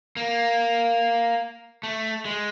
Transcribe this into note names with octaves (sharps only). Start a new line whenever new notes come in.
A#3
A3
G#3